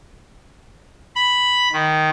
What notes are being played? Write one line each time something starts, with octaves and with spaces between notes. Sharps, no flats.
B5
D#3